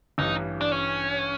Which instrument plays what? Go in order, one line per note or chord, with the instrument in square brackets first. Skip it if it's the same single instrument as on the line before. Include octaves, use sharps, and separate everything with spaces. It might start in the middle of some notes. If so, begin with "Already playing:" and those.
[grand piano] A1 G2 E3 [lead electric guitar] D#4
[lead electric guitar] D4
C#4